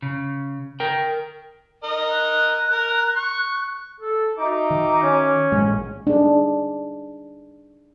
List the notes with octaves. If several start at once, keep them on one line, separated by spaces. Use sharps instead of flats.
C#3
A#4 G5
A#4 D#5
F#6
A#4
C#6
A4
D#4 F#4 E5 D6
D#3
C#4
A1 A#2 G#3
D4 D#4 G#4